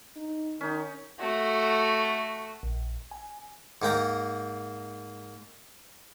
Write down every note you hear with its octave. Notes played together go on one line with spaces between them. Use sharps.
D#4
D#3 C#4 D#4
A3 F#4
A#1
G#5
G#2 A#3 G5 A#5